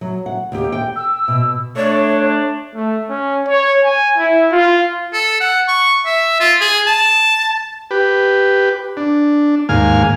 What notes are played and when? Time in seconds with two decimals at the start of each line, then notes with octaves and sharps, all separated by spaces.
0.01 F#3
0.26 F#5
0.52 D#2 G4
0.72 G5
0.96 E6
1.28 B2
1.76 A3 D4 C#5
2.75 A3
3.10 C#4
3.48 C#5
3.84 G#5
4.18 E4
4.52 F4
5.13 A4
5.40 F#5
5.68 C#6
6.06 E5
6.40 F4
6.61 G#4
6.87 A5
7.91 G4 B4
8.97 D4
9.69 D#2 G#2 A#3 F5 G#5 F6